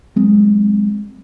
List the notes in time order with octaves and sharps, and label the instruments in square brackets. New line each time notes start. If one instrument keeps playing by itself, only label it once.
[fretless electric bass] F#3 G#3 C4